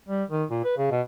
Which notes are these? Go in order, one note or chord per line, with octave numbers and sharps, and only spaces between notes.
G3
D#3
A#2
B4
C#3
B2